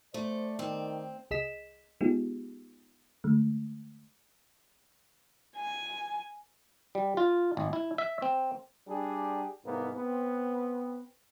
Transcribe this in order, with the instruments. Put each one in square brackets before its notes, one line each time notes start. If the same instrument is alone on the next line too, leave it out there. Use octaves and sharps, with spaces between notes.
[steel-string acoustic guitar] A3 [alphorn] C5 [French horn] D5
[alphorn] D#3 [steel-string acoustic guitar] C4
[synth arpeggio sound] C2 G#4 D#5 B6 E7
G#3 B3 D#4 F4 G4 G#4
D3 G#3 A3
[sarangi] G#5
[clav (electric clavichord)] G3
F4
G#1
E4
E5
C4
[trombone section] G3 D4 G4 G#4
C2 G#2 A#3 B3
B3 C4